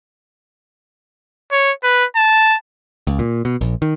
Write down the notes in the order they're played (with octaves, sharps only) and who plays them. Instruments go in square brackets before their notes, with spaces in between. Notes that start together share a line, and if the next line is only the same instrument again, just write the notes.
[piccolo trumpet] C#5
B4
A5
[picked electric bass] C#2
A#2
B2
A#1
D#3